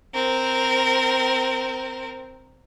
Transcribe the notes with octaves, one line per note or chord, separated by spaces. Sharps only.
C4 A#4